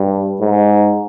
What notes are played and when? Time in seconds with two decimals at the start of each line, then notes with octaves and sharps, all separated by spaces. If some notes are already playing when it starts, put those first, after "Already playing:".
Already playing: G2
0.42 G#2